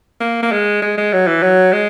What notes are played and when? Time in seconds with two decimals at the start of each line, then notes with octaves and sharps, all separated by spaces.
0.21 A#3
0.42 A#3
0.52 G#3
0.82 G#3
0.97 G#3
1.13 F#3
1.27 E3
1.43 F#3
1.73 G#3